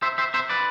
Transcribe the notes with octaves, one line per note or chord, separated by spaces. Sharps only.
C5 E5
C5 E5
C5 E5
B4 D5